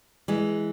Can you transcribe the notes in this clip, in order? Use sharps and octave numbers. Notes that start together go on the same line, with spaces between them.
E3 G#3